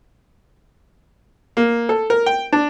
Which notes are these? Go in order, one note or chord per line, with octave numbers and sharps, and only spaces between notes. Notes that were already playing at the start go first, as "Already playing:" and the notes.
A#3
A4
A#4
G5
D4